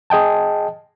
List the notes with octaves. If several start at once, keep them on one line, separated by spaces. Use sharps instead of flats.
G#4 D#5 G5 A5